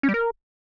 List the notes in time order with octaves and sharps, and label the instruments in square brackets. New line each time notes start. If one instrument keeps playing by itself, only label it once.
[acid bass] C#4
G3
A#4